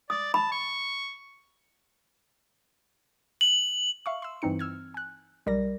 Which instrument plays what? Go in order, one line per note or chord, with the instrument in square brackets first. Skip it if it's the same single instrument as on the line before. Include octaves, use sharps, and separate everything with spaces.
[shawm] D5 [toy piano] D#6
[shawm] A5 [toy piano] B5
[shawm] C#6
[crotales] F#7
[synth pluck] E5 F5 C#6
C6 E6
G2 E3 C4 D#4 C#7
E6 F6 G#6
G#5 F#6
B1 G3 A#4 D5 A#6